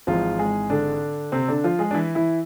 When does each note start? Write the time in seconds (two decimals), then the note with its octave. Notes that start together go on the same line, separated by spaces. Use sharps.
0.07 G#1 G#2 E3 F3 F4
0.39 G#3 G#4
0.70 D3 D4
1.32 C3 C4
1.48 D3 D4
1.64 F3 F4
1.79 G#3 G#4
1.91 D4
1.94 E3 E4
2.15 E3 E4